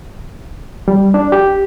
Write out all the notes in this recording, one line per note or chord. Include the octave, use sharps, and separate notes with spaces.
G3
D4
G4